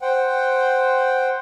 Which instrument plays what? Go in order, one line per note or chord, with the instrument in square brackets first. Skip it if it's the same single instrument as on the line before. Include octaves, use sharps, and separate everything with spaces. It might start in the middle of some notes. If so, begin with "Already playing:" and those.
[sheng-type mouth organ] C5 F#5 G5